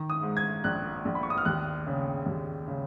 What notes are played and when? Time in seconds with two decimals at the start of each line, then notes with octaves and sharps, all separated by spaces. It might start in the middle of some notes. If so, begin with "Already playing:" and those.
Already playing: D#3
0.10 D#6
0.23 G#2
0.37 G#6
0.64 A#1 F#6
1.05 A#1
1.15 B5
1.23 C#6
1.30 D#6
1.38 F6
1.45 D#2 F#6
1.87 C#3
2.26 D#2
2.68 C#3